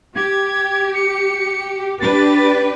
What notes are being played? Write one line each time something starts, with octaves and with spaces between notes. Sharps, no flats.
G4 G#6
C#7
D4 G4 B4 A6